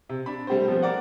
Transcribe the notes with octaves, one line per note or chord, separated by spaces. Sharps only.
C3
D4 B5
G3 A3 C4 G4 G#4 C5
F3 B3 C4
D4 A#4 D5 F#5